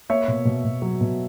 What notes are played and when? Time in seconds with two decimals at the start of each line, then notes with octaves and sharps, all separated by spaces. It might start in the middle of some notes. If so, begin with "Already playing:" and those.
0.09 A#3 C#5 E5
0.28 B2
0.45 B2
0.64 B2
0.82 F#3
1.01 B2